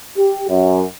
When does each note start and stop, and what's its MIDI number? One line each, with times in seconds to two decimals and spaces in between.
0.18 0.47 67
0.50 0.83 42